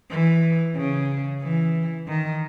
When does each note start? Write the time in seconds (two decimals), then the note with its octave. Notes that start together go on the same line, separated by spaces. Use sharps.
0.10 E3
0.76 C#3
1.42 E3
2.07 D#3